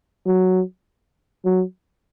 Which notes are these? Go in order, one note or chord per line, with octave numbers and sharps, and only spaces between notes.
F#3
F#3